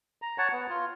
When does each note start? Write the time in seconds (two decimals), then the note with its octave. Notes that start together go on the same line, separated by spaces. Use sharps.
0.22 A#5
0.38 C#5 F#5 A5
0.52 B3
0.69 F4